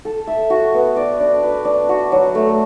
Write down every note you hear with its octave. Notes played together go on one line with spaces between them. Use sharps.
A4
E5
F#4
B3
D5
D4
B4
D4
F#4
F#3
A3